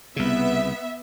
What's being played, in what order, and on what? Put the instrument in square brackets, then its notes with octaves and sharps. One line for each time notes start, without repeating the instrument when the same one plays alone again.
[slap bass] C2 C#3 [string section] B3 E5